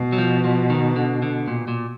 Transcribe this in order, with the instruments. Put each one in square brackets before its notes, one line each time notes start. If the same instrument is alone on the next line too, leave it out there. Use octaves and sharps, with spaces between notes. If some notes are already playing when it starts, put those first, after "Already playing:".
Already playing: [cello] B2
[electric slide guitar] F#3
F3
F3
D#3
D3
D3
A#2
A#2